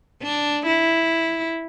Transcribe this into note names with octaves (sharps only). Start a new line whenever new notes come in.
D4
E4